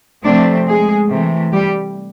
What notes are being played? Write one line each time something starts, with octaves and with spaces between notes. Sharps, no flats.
C3 F3 A3 C4 D4 D5
G#3 G#4
C3 E3 A3
G3 G4